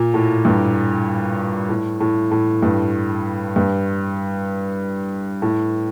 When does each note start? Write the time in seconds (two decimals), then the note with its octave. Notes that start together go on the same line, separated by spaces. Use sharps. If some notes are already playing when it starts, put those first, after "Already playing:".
Already playing: A#2
0.14 A2
0.45 G2
1.69 A2
2.00 A2
2.31 A2
2.63 G2
3.56 G2
5.42 A2